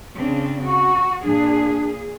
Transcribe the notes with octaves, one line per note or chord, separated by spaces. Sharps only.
C#3 C4 D4
F#4 C#6
A#2 D4 G#4